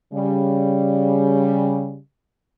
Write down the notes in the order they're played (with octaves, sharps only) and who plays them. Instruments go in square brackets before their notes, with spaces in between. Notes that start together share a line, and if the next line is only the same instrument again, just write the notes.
[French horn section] C#3 G3